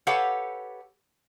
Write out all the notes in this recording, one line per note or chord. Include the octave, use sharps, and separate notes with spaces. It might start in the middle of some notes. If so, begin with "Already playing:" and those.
G4 A4 B4 C#5 F5 F#5